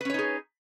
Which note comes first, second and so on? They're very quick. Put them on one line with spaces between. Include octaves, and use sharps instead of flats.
B4 C#4 C#5 D#4 G#4